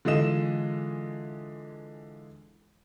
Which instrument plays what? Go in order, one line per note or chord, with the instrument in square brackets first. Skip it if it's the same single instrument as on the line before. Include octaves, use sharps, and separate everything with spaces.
[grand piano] D3 E3 G#3 F4 D#5 E7